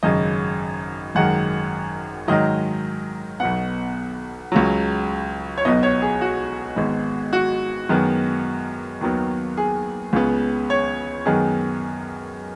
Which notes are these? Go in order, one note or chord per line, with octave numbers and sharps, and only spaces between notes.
G#1 F#2 C#3 D#5
G#1 F#2 D#3 G#3 F#5
G#2 D#3 F#3 D#5
B1 B2 B3 F#5
C#2 C#3 F#3
C#5
B1 B2 B3 D#5
C#5
G#4
F#4
G#1 G#2 G#3 B3
F#4
F#2 D#3 G#3 B3
D#2 D#3 F#3 B3
G#4
C#2 C#3 B3
C#5
F#2 D#3 G#3 B3 G#4